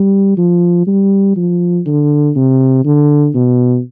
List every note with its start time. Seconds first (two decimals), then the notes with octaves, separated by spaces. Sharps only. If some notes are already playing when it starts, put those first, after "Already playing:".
Already playing: G3
0.37 F3
0.87 G3
1.36 F3
1.86 D3
2.36 C3
2.85 D3
3.34 B2